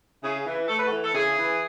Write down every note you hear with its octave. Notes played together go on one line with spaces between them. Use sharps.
C#3 E4 G#4
E3
A3 A4
B4
F#4 A4
E3
A4
C#3 E4 G#4
E3